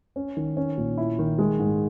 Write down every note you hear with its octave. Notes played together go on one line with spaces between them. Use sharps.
C#4
D#3
C#4
A#2
E4
D#3
G#3
G#2